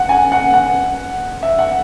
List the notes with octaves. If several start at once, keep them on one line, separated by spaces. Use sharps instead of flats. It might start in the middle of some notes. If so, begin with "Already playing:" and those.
Already playing: F#5
G#5
F#5
F#5
E5
F#5